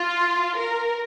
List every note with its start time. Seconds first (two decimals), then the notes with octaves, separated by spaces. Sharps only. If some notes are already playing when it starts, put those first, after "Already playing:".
Already playing: F4
0.56 A#4